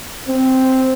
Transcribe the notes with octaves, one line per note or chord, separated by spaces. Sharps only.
C4